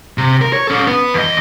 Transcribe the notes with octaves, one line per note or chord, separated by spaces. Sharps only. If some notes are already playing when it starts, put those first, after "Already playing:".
C3
A#4
C#5
C#4 A4
B3 B4
E2 D#5